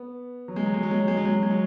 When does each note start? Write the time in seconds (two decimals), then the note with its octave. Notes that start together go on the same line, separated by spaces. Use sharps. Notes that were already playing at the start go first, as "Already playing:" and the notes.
Already playing: B3
0.48 F#3
0.56 G#3
0.66 F#3
0.74 G#3
0.83 F#3
0.91 G#3
1.00 F#3
1.08 G#3
1.17 F#3
1.25 G#3
1.33 F#3
1.43 G#3
1.51 F#3